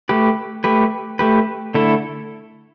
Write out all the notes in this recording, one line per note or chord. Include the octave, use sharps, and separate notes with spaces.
A3 G4 B4
A3 G4 B4
A3 G4 B4
D3 A3 E4 A4